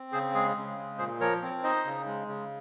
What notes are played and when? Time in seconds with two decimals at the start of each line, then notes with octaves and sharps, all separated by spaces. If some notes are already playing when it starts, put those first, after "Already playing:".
Already playing: C4
0.12 C#3 G#4 C5
0.34 G#3 G#4
0.56 C#3
0.78 G#3
0.98 A#2 G#4 C5
1.20 F3 A#4 C#5
1.42 C4
1.63 D#4 C5 D#5
1.85 C#3
2.06 G#3
2.28 C#3